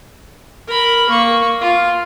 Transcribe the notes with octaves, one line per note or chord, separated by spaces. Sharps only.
A#4 B5
A#3 C#6
F4